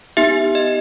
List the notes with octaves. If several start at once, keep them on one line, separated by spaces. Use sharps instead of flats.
B3 D#4 G4 E5
D#5